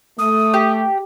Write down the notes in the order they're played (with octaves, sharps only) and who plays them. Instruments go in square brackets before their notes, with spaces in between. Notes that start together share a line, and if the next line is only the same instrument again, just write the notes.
[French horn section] A3 [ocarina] D#6
[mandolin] G4